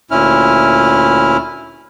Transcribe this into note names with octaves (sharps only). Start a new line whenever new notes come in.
D2 A#2 C#4 E4 F6